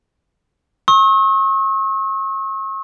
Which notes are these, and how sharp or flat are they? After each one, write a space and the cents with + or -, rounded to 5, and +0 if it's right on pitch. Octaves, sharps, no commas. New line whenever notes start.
C#6 -40 E6 -45